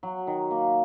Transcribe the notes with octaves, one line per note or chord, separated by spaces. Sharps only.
F#3
D#3
A#3